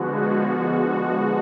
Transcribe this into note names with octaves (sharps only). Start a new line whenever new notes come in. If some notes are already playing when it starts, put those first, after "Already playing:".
Already playing: D3 F3 G#3 B3 F#4
F#4
F#4